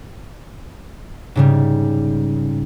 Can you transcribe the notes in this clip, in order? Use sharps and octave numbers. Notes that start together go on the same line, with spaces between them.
G#2 C#3 G3